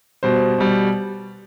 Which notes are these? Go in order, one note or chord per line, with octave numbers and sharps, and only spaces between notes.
B2 G3 C5
B2 G3